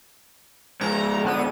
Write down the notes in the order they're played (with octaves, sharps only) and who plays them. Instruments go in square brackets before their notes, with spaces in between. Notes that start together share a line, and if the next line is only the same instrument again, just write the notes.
[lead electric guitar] C#2 G#2 [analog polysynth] A#5
[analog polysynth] D3 B3 D#7